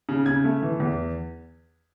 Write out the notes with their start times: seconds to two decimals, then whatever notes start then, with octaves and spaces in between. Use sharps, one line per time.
0.09 C#3
0.26 C#3 G#6
0.44 A3
0.63 E3
0.80 E2